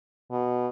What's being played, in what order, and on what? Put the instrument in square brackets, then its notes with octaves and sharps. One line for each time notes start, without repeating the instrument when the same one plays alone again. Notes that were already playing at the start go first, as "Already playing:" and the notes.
[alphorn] B2